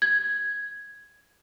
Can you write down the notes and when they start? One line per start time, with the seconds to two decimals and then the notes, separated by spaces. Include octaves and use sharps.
0.02 G#6